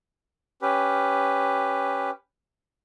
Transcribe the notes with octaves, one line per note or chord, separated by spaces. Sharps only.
C#4 G4 B4